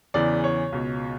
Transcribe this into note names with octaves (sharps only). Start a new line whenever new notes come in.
E2 C#3 E3 D5
C#5
C#2 B2